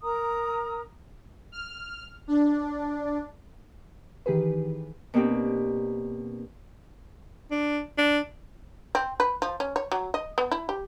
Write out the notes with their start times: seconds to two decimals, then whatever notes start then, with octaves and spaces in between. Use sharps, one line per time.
0.03 A#4 A#5 D#6
1.52 F6
2.28 D4
4.26 D#3 E3 G4 G#4 B4
5.14 B2 A#3 C4 D4 G4
7.51 D4
7.98 D4
8.95 C4
9.20 B4
9.42 F3
9.60 C#4
9.76 C#5
9.92 F#3
10.14 D#5
10.38 B3
10.52 E4
10.69 G4